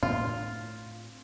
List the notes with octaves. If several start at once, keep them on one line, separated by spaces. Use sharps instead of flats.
A2 C4 D4 F4